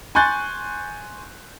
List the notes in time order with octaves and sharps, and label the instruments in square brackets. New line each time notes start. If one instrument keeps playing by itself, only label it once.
[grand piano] G#5 C6 C#6 F#6 G6 A6